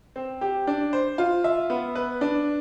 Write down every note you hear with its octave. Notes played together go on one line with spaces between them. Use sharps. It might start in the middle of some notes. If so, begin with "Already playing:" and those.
C4
G4
D4
C5
F4
E5
B3
B4
D4